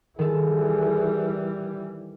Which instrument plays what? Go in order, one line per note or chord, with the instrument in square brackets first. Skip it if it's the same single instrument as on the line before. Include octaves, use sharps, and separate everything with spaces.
[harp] D#3 A4 [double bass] E3 G3 [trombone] G#4